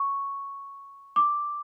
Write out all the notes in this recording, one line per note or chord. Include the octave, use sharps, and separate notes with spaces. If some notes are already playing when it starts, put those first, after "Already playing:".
Already playing: C#6
D6